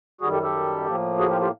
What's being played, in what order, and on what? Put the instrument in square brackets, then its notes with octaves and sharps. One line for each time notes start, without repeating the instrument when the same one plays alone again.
[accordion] F#2 D#3 G3 F#4 G#4
G4 A4
G4 A4
A2 F3 A#3
F#4 G#4
F4 G4
F4 G4